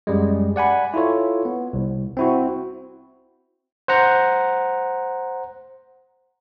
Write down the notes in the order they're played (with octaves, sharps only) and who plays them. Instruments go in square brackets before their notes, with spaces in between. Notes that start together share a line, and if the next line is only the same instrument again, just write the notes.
[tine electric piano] F#2 G3 G#3
D5 F#5 G#5 B5
E4 F4 A4 C#5
B3
C2
C4 E4 F#4
C5 F#5 A#5